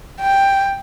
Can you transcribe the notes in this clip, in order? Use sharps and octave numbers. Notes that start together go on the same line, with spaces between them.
G5